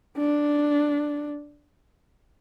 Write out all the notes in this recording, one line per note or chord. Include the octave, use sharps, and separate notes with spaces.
D4